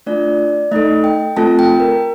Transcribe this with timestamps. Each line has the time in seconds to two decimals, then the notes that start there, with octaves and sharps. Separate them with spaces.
0.06 A3 D4 F4 D5
0.72 A3 D#4 A4 D#5
1.04 G5
1.36 A3 C4 F4 A4 A5
1.59 G5
1.80 A#4